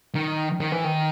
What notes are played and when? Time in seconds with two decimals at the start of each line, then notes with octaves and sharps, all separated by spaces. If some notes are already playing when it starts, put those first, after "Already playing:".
0.15 D#3
0.61 D#3
0.72 E3
0.84 D#3